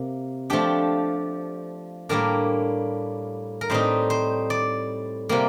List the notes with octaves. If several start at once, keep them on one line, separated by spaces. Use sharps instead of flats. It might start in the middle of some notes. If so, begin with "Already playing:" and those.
Already playing: C3 A#3
F3 A3 D4 G4
A2 G3 A#3 D4 A#4
A#4
A2 G3 C4 D#4 C5
C5
D5
C3 G3 A#3